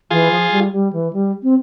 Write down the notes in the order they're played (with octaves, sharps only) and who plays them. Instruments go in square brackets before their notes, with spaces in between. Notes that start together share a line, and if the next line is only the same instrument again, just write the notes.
[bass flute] E3 [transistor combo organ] F4 G#4
[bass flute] F3
G3
G3
E3
G3
C4